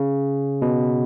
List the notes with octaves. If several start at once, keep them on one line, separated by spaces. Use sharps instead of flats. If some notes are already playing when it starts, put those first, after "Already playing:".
Already playing: C#3
B2